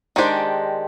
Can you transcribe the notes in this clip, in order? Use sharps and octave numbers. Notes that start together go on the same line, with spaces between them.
D#3 G#3 D4 G4 C5